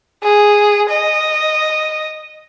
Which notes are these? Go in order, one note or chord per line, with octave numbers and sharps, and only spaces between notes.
G#4
D#5